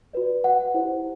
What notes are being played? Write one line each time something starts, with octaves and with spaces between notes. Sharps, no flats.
F#4 B4 D5
F#5
E4 G4 C5